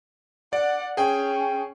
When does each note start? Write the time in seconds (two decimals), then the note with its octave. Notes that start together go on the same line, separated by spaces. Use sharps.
0.53 D5 F#5
0.97 C#4 G#4 G5